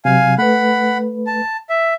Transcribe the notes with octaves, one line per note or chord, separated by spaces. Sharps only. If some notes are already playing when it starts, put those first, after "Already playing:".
C3 F#3 F5 G#5
A3 B4 F#5 B5
A5
E5